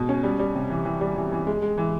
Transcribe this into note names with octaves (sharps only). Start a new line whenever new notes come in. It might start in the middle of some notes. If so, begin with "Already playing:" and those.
Already playing: B2 G#3
C#4
G3
G3
C3
E3
E3
G3
E3
E3
G#3
G#3
E3